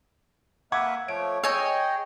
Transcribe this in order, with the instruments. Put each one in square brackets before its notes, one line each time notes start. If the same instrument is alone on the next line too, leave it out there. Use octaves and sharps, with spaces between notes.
[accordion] A#3 B4 E5 [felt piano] F#5 D6 G#6
[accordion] F3 A3 C#5 [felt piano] D7
[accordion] G#4 D#5 G5 [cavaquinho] C#5 G#5 [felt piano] E6